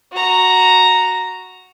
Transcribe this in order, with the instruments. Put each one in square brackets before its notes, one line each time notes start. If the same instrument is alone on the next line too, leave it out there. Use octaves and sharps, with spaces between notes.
[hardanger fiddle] F#4 A#5